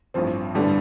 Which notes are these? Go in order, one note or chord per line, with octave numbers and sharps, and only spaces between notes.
A1 G2 F3 C4
A1 G2 D3 G3 B3 D4